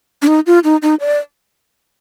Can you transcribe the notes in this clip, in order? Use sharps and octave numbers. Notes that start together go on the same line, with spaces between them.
D4
D#4
F4
D#4
D#4
D5